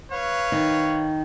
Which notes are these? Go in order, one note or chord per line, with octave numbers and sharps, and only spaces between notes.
B4 C#5 F5
D#3